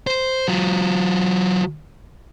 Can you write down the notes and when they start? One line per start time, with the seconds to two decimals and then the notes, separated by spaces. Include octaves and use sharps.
0.07 C5
0.48 F#3 F4